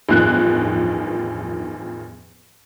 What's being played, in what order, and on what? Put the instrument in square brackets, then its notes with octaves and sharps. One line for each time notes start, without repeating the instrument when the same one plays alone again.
[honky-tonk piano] A1 E2 G2 D#3 F3 F#6